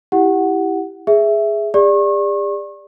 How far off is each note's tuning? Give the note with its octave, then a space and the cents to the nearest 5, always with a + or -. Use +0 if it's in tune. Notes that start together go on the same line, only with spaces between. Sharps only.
E4 +0 G4 +0 F#5 +5
G#4 +0 E5 +0
G#4 -45 D5 +0 C#6 -35